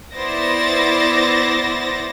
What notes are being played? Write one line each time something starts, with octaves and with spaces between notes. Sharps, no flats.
B3 E4 C5 D5 A6 A#6